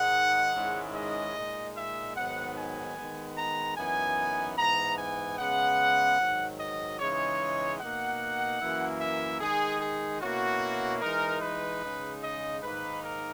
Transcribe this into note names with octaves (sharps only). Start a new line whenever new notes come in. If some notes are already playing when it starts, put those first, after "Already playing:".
Already playing: G#2 D#3 G#3 D#4 F#5
G#2 D#3 G#3 C#4 E4
D#5
A#2 G#3 D#4
E5
G#2 D#3 F#3 B3 F#5
G#5
D#3 G#3 B3
A#5
F#2 E3 B3 D#4 G#5
G#2 E3 B3 A#5
G#5
C#3 G#3 B3 F#5
G#2 D#3 F#3
D#5
C#3 E3 G#3 D#4 C#5
B2 A#3 D#4 F#5
F#2 E3 A#3 E4
E5
D#3 G#3 D#4 G#4
G#4
B2 A#3 C#4 E4 F#4
E3 G#3 D#4 A#4
B4
C#3 G#3 D#4
D#5
G#2 D#3 A#3 D#4 B4
A#4